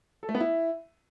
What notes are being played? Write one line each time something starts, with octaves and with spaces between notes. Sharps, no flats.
A4
A3
B3
E4